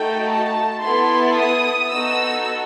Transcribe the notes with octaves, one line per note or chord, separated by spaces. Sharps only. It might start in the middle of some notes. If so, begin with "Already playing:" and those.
Already playing: A3 D#4 F#4 A4 G5
A5
B3 E4 A4 C6
D#6
B3 D#4 F#4 A4 E6